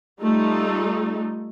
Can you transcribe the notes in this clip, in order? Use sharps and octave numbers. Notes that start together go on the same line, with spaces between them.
G3 A3 D#4 F4 A4